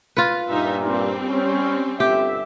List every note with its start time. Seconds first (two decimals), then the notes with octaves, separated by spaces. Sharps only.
0.17 F4 B4
0.48 G2 A#2 D#4 E5
0.85 G3 C4
1.28 C#4
2.00 G1 G4 E5